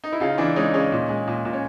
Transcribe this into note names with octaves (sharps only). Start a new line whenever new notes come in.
D#4
E4
C#3 D#4 F4
E3 D4 E4
G#3 C#4 D#4
C#3 C#4 D#4
A#2
G#3
A#2
A#2
C#4